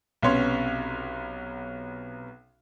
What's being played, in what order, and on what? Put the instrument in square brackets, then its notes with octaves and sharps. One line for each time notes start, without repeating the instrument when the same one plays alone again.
[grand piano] B1 C3 B3 C#4 C#5 C6